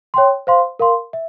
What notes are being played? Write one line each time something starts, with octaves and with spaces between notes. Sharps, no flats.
C#5 G5 C6
C5 F5 C6
A#4 F5 C6
E5